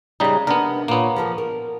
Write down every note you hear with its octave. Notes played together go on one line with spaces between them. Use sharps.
C#3 G3 G#3 D#4 D#5
C3 B3 D4 A#4
A#2 A#3 B3 C#5
F3 A4 A#4
A#4